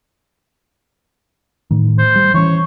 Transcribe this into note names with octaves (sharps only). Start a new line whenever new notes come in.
A2 D#3
C5
G3
E3 C#4 C#5